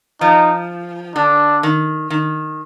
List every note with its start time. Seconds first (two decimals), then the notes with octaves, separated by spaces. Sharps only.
0.21 F3 D#4
1.16 D3 D4
1.63 D#3
2.10 D#3